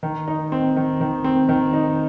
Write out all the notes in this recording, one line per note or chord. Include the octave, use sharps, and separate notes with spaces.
D#3
D#4
C4
D#3
D#3
C4
D#3
D#4